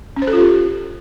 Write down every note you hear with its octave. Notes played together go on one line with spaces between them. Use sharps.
C#4
C5
A4
F4
G4